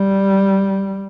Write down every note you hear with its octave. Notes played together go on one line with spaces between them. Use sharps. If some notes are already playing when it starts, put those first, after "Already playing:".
Already playing: G3